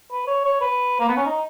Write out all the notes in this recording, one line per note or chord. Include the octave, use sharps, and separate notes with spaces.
B4
C#5
C#5
B4
A#3
B3
C#4
D#4